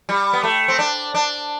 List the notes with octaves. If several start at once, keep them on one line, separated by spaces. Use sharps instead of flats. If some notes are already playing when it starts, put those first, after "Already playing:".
G3
B3
A3
C4
D4
D4